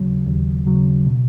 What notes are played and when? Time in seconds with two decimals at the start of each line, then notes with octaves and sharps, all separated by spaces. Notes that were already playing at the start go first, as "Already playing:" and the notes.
Already playing: D#2 C#3 F#3
0.27 D#2
0.66 C#3 F#3
1.06 B2